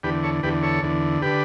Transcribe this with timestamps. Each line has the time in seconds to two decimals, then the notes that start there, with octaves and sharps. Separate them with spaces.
0.03 E2 D3 G4 B4
0.23 A4 C#5
0.43 E2 D3 G4 B4
0.63 A4 C#5
0.83 E2 D3
1.22 D3 G4 B4